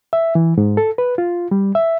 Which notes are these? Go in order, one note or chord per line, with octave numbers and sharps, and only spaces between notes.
E5
E3
G#2
A4
B4
F4
G3
E5